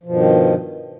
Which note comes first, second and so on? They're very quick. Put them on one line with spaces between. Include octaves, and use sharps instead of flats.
F3 B2 G2 D#3